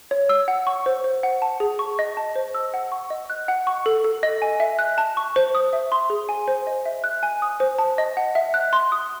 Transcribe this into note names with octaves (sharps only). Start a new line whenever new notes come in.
C#5
E6
F#5
C#6
C5
C5
F#5
A5
G#4
C#6
D#5
A5
C5
E6
F#5
C#6
D#5
F#6
F#5
C#6
A4
A4
D#5
G#5
E5
F#6
A5
C#6
C5
D#6
E5
C6
G#4
G#5
C5
D#5
E5
F#6
G#5
D#6
C5
A5
D#5
F#5
E5
F#6
C6
D#6